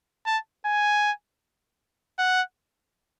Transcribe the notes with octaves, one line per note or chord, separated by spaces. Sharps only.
A5
G#5
F#5